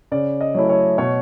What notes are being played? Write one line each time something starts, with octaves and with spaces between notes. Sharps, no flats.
C#3 D5
D#5
F#3 A3 C#4 E4
C#5
B2 C#5